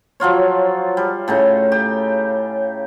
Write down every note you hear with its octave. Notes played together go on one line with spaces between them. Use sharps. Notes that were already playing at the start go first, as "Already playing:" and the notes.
F3 F#3 F4 C#5
G3
A2 C#3 D#4
G4